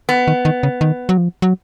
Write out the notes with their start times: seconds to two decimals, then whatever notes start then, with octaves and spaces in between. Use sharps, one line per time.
0.09 B3
0.28 D#3
0.45 D#3
0.63 C#3
0.81 D#3
1.09 F#3
1.18 F3
1.42 F#3